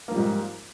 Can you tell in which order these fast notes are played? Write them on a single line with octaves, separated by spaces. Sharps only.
A#3 F3 G3 G#2